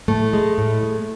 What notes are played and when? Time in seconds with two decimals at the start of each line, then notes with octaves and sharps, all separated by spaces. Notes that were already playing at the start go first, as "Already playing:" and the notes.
0.08 A2 A3
0.33 G#3
0.58 A2
0.83 G#3